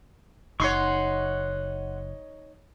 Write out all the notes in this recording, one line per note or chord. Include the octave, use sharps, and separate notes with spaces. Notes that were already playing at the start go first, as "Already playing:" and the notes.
F#1 D#4 C#5 F#5 C6 C#6